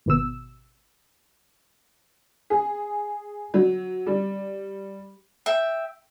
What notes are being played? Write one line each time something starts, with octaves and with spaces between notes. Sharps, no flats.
G#1 B2 E6
G#4
F#3
G3
E5 G5